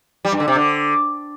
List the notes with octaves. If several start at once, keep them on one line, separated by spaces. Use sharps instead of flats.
G3
G2
D3
C3
D3